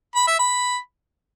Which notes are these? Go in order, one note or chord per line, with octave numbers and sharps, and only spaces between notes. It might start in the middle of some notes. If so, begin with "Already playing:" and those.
B5
E5
B5